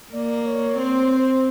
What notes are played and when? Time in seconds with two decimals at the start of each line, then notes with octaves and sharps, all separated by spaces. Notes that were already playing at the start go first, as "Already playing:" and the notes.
0.13 A#3 D5
0.45 C#5
0.78 C4 C5
1.11 C5